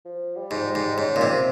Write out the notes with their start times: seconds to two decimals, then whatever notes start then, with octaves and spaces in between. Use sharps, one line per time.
0.05 F3
0.37 G3
0.51 G#2
0.56 F3
0.67 G3
0.75 G#2
0.98 G#2 C#4
1.16 A#2
1.21 C3
1.29 C4